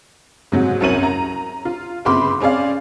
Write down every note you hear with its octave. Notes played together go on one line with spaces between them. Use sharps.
G#2 C3 F#3
C2 F#2 C#4 A#4 D#7 F#7
A#5
F4
G1 C#3 C4 B5 C6 D6
C4 C#4 G#4 D5 F5